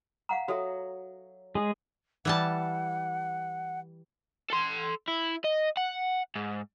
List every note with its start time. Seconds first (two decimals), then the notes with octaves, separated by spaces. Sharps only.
0.29 F5 F#5 A#5
0.48 F#3 F#4 A4 E5
1.55 G#3 G#4
2.25 E3 G3 F#5 A5
4.50 A4 C6
5.08 E4
5.44 D#5
5.77 F#5
6.36 G#2